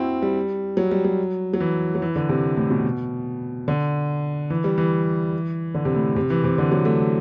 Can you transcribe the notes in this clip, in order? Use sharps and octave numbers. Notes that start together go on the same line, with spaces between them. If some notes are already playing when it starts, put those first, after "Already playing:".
Already playing: C4 E4 F#4
G3
F#3
G3
F#3
F#3
E3
F#3
E3
D3
C3
A2
B2
D3
E3
G3
E3
D3
C3
A2
C3
E3
C3
D3
F#3
A3